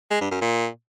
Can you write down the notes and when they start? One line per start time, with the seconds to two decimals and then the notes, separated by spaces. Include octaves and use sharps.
0.11 G#3
0.21 G2
0.31 F#2
0.42 A#2